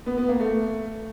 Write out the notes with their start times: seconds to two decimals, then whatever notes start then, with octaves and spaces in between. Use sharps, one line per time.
0.06 B3
0.18 B3
0.29 A#3
0.40 A3